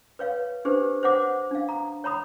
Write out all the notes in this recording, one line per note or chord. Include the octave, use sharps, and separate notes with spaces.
B4 C#5 F5
D4 G4 G#4 B4 C5
C5 C#5 F#5 D6
D4 F5
A#5
C#5 A#5 B5 D#6